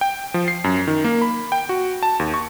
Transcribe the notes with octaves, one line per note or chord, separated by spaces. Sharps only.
G5
F3
C7
F#2
D#3
A#3
B5
G5
F#4
A5
D#2
C#6